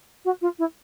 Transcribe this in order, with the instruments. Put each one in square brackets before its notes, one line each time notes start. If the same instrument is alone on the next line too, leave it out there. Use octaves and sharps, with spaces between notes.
[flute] F#4
F4
E4